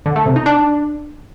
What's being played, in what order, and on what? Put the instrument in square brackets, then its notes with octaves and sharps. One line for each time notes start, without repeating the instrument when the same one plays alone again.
[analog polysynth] D3
A3
C3
D#4
D4